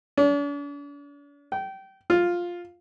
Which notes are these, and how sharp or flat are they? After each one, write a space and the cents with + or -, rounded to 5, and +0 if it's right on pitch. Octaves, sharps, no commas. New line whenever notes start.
D4 -45
G5 -25
F4 +5